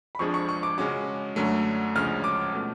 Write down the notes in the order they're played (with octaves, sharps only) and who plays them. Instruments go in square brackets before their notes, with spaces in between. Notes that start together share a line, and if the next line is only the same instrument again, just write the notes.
[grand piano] B5
[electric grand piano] F2 F3 G#3 D4 G#4 [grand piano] C#6
[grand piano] C#6
C#6
D6
[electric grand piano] C#3 G#3 C#4 F#4 [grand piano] D6
[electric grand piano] F#2 D3 F#3 A3
[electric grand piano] D2 C#3 F3 G#3 C#4 [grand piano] F6
[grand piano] D6
[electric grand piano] B2 A3